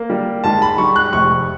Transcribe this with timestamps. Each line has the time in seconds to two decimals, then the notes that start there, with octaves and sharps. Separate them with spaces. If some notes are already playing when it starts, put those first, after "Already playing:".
Already playing: A#3
0.10 G3
0.44 G#2 A5
0.62 B5
0.78 G3 C#6
0.96 F#6
1.13 F1 C#6